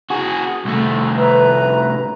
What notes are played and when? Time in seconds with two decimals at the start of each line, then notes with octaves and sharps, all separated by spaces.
0.10 F#4 G#4
0.65 C2 A3
1.15 B4 E5 A#5